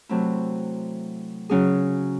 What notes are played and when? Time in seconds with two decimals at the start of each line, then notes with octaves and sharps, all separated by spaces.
0.09 C3 F#3 A3 C4 E4
1.49 C#3 F#3 C#4 G#4